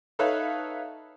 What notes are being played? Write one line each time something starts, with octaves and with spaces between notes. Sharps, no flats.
D#4 A4 B4 C#5 E5 F5